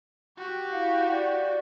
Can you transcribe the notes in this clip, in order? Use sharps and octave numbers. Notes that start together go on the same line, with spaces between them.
F#4 G4
E4 F5 F#5
D5